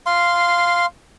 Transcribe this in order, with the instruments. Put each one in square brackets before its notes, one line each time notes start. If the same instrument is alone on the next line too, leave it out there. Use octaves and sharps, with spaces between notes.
[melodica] F5 C6